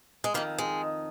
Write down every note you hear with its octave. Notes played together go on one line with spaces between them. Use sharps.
G#3
F2 D#3 A#3
G#3